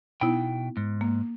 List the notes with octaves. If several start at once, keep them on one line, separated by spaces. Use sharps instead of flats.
B2 B3 D#4 E4 G5
G#2
A#3